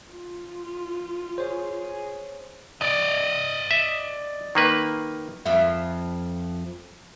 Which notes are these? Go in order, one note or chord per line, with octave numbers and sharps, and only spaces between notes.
F4
G#4 C5 C#5
D5 D#5
E5
D#3 A#3 B4
F2 F4 E5